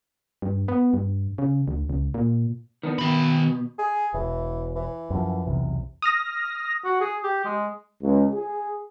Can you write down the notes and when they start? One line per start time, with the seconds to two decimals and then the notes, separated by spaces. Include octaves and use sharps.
0.42 G2
0.68 B3
0.94 G2
1.38 C#3
1.68 D2
1.90 C#2
2.14 A#2
2.83 D#3 B3 D4
2.99 B2 D#3 B5
3.79 G#4
4.14 E1 E3
4.76 E3
5.10 F#2 F3
5.47 B1 E2 C3
6.02 D#6 F6 A#6
6.85 F#4
7.01 G#4
7.24 G4
7.45 G#3
8.02 C#2
8.33 G#4